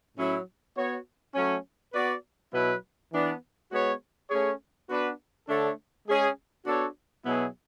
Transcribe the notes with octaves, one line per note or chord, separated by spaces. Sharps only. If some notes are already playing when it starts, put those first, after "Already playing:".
A2 F#3 C#4 E4
B3 F#4 C#5
F#3 A3 C#4
B3 F#4 B4 D5
B2 F#3 B3 E4 B4
E3 B3 D4
G#3 B3 F#4 C#5
A3 C#4 G#4 C#5
B3 D4 F#4 B4
D3 A3 D4 A4 C#5
G#3 C#4 G#4
B3 D4 F#4 A4 C#5
B2 F#3 B3 E4 G#4